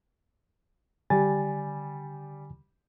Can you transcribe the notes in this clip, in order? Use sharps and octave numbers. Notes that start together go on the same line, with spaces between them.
D3 G3 G#5 A6